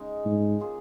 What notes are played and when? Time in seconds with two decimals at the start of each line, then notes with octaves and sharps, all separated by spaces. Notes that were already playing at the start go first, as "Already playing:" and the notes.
Already playing: C#3 G#3 D#4
0.26 G#2
0.60 C#3 A#3 F4 G#4